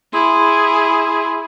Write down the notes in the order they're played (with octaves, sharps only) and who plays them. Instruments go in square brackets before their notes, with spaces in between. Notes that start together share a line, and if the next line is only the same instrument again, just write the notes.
[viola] E4 G#4 [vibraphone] C6